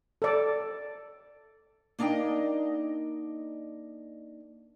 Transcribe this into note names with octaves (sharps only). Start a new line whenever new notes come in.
A4 D5
A#3 D4 D#4 D#5 G5